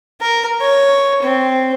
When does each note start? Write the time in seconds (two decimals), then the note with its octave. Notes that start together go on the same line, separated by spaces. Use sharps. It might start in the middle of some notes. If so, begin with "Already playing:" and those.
0.21 A#4
0.61 C#5
1.22 C4